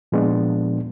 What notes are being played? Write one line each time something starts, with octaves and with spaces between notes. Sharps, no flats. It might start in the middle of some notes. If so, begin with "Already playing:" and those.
A#2 F3 G#3 B3 D4